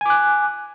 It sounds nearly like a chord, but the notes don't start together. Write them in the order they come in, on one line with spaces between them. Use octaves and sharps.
G#5 D6 F#6